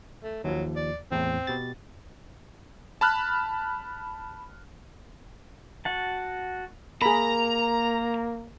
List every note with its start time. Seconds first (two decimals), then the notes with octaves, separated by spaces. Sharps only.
0.23 A3
0.44 D#2 F3 F#3
0.76 D5
1.12 E2 A2 C4
1.47 B2 G4 A6
3.01 A5 B5 F6 F#6
5.85 F#4 F#5 A5
7.02 A#3 G#4 A#4 A#5 B5